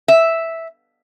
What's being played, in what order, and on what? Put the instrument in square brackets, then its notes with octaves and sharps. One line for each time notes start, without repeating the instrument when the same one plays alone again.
[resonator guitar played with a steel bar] E5